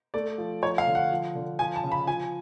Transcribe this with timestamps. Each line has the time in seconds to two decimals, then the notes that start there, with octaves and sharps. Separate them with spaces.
0.14 A3 D5
0.38 F3
0.63 F3 C#5
0.78 F5
0.87 D3
0.95 F#5
1.11 F3
1.35 D3
1.59 F3 G#5
1.76 A5
1.84 C#3
1.92 B5
2.07 F3 G#5